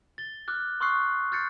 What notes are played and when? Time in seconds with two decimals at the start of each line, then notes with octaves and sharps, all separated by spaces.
0.18 A6 G7
0.48 D6 F6 F#6
0.81 C6 C#6 D#6 F6 F#6 C7
1.32 F6 G6 A6 C7 C#7